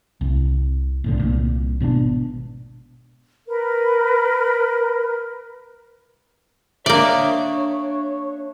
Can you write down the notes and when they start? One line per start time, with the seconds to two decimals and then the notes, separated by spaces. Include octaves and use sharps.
0.21 C2
1.04 B1 A2 D3
1.18 C2 A#2
1.80 G#1 B2 B3 D4
3.47 A#4 B4
6.86 A#3 D4 C#5 D5 E5